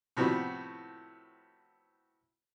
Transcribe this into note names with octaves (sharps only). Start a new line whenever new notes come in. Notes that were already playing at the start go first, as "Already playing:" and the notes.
A2 C3 F3 G3 B3 F#4